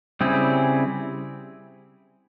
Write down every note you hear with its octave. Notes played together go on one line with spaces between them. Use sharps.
C#3 G3 C4 E4 G#4